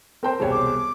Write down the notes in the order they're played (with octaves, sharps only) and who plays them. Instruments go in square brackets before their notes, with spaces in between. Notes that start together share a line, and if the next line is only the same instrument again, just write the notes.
[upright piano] C4 C5 [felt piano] A#4 G5
[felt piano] E1 C2 C#5
[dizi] D6